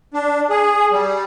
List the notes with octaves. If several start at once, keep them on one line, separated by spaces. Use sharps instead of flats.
D4
G#4
G3